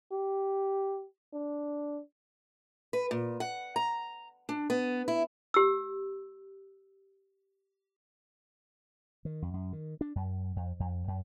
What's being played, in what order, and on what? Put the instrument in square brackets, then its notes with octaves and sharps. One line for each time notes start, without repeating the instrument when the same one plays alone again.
[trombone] G4
D4
[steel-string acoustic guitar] B4
A#2
F#5
A#5
D4
B3
E4
[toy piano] G4 E6
[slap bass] D#3
F2
F#2
D#3
D4
F#2
F2
F2
F#2